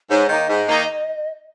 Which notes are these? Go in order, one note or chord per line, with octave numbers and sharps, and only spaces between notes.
G#2 C#5
D#3 A#3 D#4 D#5
G#2
D#3 A#3 D#4